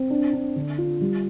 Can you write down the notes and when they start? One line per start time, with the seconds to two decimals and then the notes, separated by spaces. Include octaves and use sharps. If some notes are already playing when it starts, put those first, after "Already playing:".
Already playing: C4
0.10 D4
0.33 D4
0.56 D3
0.78 F4
1.01 G3